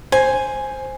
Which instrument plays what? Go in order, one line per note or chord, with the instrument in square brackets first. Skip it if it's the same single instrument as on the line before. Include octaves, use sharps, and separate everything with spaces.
[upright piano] C5 [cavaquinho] G#5